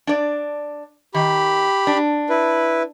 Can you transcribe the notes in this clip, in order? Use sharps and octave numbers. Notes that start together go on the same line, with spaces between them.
D4 D5
D#3 G4 B5
D4
E4 B4